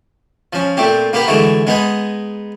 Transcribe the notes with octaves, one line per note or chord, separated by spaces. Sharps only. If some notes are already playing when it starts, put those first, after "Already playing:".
F3 C#4
A#2 A3 C4 G4
A#3 B3 G4 B4 G5
D3 E3 G#3 A3 F#4
G#3 B3 D#4 G#5